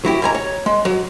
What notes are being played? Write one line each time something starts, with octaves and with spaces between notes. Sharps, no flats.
F#3 E4 G4
G#2 G#5 A#5
C#5
G#3
F#3